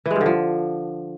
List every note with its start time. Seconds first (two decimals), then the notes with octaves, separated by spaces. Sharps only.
0.06 E3
0.11 G#3
0.16 G2
0.21 D3
0.26 F3